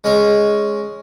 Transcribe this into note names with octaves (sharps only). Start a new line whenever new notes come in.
G#3 C#4 C#5